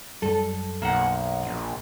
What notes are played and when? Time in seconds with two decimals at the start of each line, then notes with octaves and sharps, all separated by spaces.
0.22 F#2 G3 A4
0.82 B1 A#3 F#5
1.43 A#1